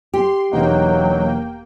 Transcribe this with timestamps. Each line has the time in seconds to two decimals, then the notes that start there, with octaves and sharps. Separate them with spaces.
0.14 G4 C6
0.52 E1 F#3 A#3 D#4 F#5 G5